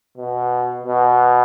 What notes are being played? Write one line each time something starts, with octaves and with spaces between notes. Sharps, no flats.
B2
B2